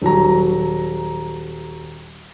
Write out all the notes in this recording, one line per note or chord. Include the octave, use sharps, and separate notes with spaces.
D#1 F#3 A#5